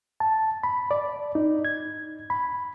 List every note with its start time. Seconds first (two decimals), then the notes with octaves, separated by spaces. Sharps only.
0.20 A5
0.64 B5
0.91 D5
1.35 D#4
1.65 G#6
2.30 B5